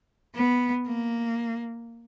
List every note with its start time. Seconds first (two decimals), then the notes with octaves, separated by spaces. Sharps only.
0.35 B3
0.87 A#3